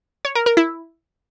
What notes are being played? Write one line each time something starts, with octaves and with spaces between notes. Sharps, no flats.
C#5
A#4
A#4
E4